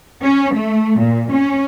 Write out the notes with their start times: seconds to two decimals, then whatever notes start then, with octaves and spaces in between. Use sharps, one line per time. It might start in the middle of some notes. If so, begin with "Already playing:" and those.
0.24 C#4
0.56 A3
1.00 A#2
1.33 C#4